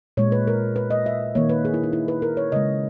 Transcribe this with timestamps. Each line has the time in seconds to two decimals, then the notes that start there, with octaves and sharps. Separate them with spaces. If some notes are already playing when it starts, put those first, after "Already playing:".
0.17 A#2 G#3 C#5
0.32 B4
0.47 A#4
0.76 B4
0.91 D#5
1.06 E5
1.35 D#3 A#3 C#5
1.49 B4
1.65 G#4
1.74 E4
1.83 D#4
1.93 E4
2.08 B4
2.22 A#4
2.37 C#5
2.52 C#3 G#3 D#5